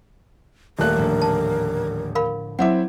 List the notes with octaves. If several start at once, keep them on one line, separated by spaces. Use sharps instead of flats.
D#1 A3 A#4 F#6
A2 D3 F3
A5
A#4 F5 B5
F#3 C4 E4 E5 F#5 D6